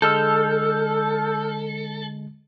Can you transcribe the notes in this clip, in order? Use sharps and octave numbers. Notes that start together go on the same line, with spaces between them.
D3 G#3 A4 E6 F6 G6